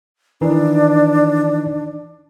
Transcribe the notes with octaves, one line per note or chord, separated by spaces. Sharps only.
D#3 E3 D4 D#4